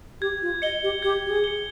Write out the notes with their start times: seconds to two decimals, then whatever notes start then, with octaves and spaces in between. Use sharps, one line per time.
0.21 G4 G#6
0.42 F4
0.62 D#5 C#7 G7
0.83 G4
1.02 G4 G#6
1.26 G4
1.30 G#4
1.44 C#7 G7